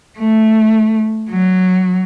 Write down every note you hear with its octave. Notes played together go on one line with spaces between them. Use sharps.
A3
F#3